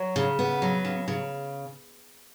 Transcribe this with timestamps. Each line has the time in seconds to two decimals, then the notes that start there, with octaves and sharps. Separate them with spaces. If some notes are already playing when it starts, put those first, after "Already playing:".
Already playing: F#3
0.16 C#3
0.39 B3
0.62 F#3
0.85 C#3
1.08 C#3